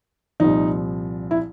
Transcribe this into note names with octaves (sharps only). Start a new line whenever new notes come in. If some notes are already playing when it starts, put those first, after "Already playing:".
C2 A#2 F3 D#4
E4